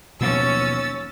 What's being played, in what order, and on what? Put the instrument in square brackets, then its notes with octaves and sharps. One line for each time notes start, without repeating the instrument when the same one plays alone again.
[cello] D#2 C#4 [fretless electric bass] B2 F3 F#3 [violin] E6 A6